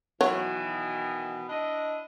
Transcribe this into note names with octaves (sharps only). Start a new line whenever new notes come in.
B2 D#3 E3 F#3 C#5
D4 E4 D#5